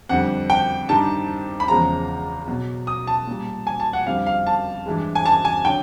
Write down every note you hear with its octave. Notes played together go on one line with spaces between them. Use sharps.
F2 D3 G3 F#5
G5
G2 D#3 G3 A5
B5
E2 C#3 F3 G#3 A#5
B2 F#3
D#6
A5
A#2 G3
G#5
A5
F#5
F2 D3 G3 F5
F5
A5
G2 E3 G#3
G#5
A5
G#5
D3 F#3 G5